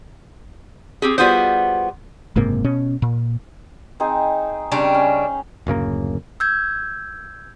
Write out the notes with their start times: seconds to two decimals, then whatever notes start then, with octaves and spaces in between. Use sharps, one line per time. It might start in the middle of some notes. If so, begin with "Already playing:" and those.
1.02 C4 G4 G#4
1.18 G3 B3 F4 F#4 G#4 C5
2.36 F#1 G#2 C3 A#3
2.64 B2 C#4
3.02 A#2
4.00 C4 D#4 G#4
4.71 C#3 G3 C4 D4
4.95 C#4
5.67 D1 F#2 C#3 A#3
6.40 E6 G6 G#6